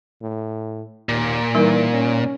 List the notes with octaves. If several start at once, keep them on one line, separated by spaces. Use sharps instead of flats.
A2
D#2 A#2
E3 G3 D#4 A#4
C#4